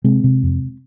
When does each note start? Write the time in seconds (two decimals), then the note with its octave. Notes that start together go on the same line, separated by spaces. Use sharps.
0.04 C3 G#3 C4
0.24 C3
0.43 F2